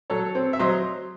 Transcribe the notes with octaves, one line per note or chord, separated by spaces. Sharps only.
F#3 A4 C#5
C4
E5
F#3 C5 D#5